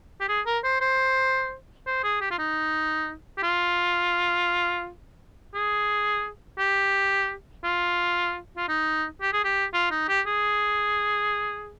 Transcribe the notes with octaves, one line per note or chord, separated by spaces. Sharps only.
G4
G#4
A#4
C5
C5
C5
G#4
G4
F4
D#4
G4
F4
G#4
G4
F4
F4
D#4
G4
G#4
G4
F4
D#4
G4
G#4